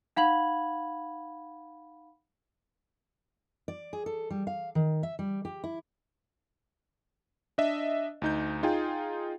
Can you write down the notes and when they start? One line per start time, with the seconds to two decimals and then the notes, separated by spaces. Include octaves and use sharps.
0.16 D#4 F5 F#5 B5 G#6 F#7
3.68 D5
3.93 G#4
4.06 A4
4.30 G3
4.47 F5
4.75 D#3
5.03 E5
5.19 G3
5.45 G4
5.64 E4
7.58 D4 D#5 E5
8.22 D2 D#4 G6
8.63 D#4 F4 G#4 G5